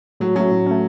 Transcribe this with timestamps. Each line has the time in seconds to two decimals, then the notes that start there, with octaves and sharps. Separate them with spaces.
0.20 A2 F#3
0.35 F#3 A3 C#4
0.51 A2
0.66 A3 C#4